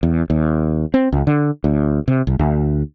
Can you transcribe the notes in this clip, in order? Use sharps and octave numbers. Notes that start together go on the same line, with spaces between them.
E2
D#2
C4
C#2
D3
D2
C3
C2
D2